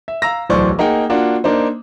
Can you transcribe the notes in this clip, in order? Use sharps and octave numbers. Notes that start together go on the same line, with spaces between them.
E5
F5 A#5 E6 A#6
D1 B1 E3 C5 D5 C#6
A#3 D#4 G#4 F#5 G5
A#3 D4 F4 F#4
A#3 D4 D#4 C5